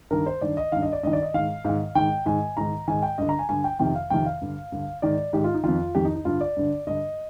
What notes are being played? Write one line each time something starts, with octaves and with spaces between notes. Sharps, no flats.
G2 D#3 A#4
C5
G2 D#3 D5
D#5
G2 D#3 F5
D#5
D5
G2 D#3 D#5
D5
D#5
G#2 D#3 F5
G#2 D#3 F5
G#2 D#3 G5
G#2 D#3 G#5
G#2 D#3 A#5
G#2 D#3 G#5
G5
G2 D3 D#5
A#5
G#5
G2 D3 G#5
G5
F2 C3 D#3 G5
F5
F2 C3 D#3 G5
F5
G2 D3
G2 D3
G#2 D#3 D5
G#2 D#3 G4
F4
D#4
F2 D#3 F4
F2 D#3 G4
D#4
D#4
G2 D3 F4
D5
G2 D3
G2 D3 D#5